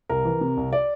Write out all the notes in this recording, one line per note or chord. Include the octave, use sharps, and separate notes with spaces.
C2 A#4
E3
C3
C2
D5